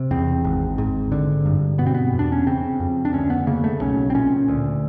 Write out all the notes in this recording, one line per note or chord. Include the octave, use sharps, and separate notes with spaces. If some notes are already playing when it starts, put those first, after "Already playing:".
Already playing: C3
E2 C4
G#1
G#2
D3
G2
B2 B3
C4
B3
E2
D4
C#4
C#3 C4
F2
D4
D2 C#4
B3
C#3 A#3
A3
B1 C#4
C4
A#2 C#4
D2